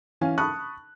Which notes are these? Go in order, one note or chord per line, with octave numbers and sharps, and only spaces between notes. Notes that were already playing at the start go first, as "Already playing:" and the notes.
E3 C#4 F5 G#5
A5 B5 C#6 D#6 F#6